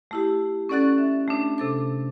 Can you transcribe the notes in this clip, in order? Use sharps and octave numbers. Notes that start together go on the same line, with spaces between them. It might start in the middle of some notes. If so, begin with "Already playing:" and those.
A3 E4 G4
C#4 A4 D5 F#5 F#6 A6
E5
A3 D4
C3 A4 D6